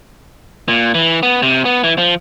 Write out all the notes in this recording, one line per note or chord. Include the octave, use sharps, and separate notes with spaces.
A#2
E3
B3
C3
B3
E3
F3